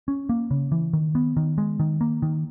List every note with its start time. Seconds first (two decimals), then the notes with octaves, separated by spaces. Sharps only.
0.08 C#4
0.29 A#3
0.51 C#3
0.72 E3
0.93 D#3
1.15 B3
1.37 D#3
1.58 G#3
1.80 D#3
2.01 A#3
2.22 D#3